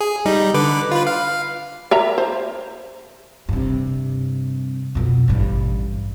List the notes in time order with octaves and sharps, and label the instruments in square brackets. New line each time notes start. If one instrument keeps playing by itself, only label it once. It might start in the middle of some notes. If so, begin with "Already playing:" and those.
[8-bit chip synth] G#4
G3 D#4
D3 B4 D6
F4 B4
F5
[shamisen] A#4 E5 A#5
C5
[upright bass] G2 C3
F2 B2
A1 G2